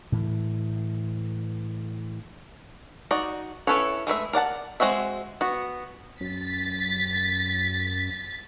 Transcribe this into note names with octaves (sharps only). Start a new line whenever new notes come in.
A2 E3
D#4 F#4 D5
C#4 E4 A4 B4 C#5
G#3 A3 B4 E5
A#4 D5 F#5 A5
G#3 C4 F#4 E5
B3 F#4
F#2 A6 B6